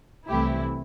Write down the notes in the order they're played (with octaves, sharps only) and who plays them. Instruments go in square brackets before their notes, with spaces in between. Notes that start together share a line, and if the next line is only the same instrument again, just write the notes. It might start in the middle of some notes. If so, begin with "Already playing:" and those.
[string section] C2 C3 E3 A3 E4 G4